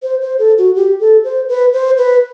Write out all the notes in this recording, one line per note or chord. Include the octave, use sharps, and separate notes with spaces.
C5
C5
A4
F#4
G4
A4
C5
B4
C5
B4